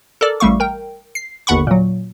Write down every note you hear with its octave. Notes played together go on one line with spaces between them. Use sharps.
A4 A#4 D5
A1 G3 A3 F5 C#6
A#4 G5
C7
G1 D#2 D3 F#5 B5 C#6
A#2 F#3